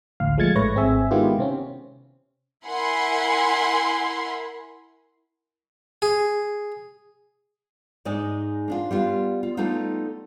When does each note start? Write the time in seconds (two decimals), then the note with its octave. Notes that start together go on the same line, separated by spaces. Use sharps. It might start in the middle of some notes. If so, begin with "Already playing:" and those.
0.20 A1 D2 F5
0.38 F3 G#3 A3 G#6 A6 C#7
0.55 A1 G#2 A3 B4 C#5 A#6
0.75 G#1 C4 G#4 E5 G#5
1.11 D#3 G#3 B3 E4 F4 G4
1.38 C3 C4 C#4
2.67 E4 A#4 F#5 G#5 B5 C6
6.02 G#4
8.05 G#2 G#3 D#4 D5 D#5
8.68 A#3 D4 F4
8.91 G3 B3 F4
9.43 F4
9.57 G3 A3 B3 D#4 F4